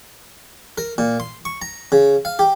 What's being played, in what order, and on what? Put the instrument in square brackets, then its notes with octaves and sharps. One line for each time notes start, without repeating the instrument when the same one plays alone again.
[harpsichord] A#4
A#2
C6
C#6
A#5
C#3
F5
G4